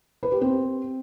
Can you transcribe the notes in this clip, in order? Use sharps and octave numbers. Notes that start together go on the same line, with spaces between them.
B4
G4
C4